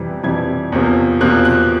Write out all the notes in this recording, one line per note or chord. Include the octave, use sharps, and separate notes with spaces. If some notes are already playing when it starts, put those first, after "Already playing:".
Already playing: F2 C3 E3 G3
F2 C3 E3 G3 G#6
E2 C3 F3 A#3
E2 C3 F3 A#3 F#6
F#6